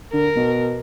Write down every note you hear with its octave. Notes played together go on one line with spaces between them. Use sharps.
D3 A#4
B2